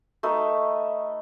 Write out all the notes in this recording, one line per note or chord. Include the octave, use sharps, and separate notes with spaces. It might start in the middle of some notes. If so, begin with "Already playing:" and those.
A3 D#4 B4